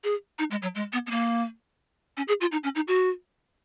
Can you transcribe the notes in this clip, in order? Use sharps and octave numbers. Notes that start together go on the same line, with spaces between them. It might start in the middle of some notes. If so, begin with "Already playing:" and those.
G#4
D#4
G#3
F#3
G#3
B3
B3
A#3
C#4
G#4
F4
D#4
C#4
D#4
F#4